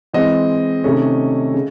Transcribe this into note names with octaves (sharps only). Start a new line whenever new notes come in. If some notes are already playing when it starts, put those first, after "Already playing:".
E3 G#3 C4 D#5
C3 D#3 A3 C#4
C#3